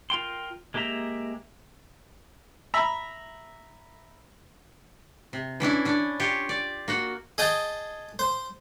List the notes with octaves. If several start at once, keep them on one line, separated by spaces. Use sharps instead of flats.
F4 A#4 G5 C6
G#3 A#3 G4 E5 A#5
E5 A#5 B5
C3
E3 C#4 D4 E4
C#4 D4
F4 G4 C#5
D5
A#3 F#4 F#5
G#4 D#5 G5 A5
C5